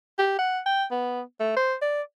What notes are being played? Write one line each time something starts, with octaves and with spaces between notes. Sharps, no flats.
G4
F#5
G5
B3
A3
C5
D5